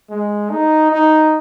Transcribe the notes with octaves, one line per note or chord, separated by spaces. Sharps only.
G#3
D#4
D#4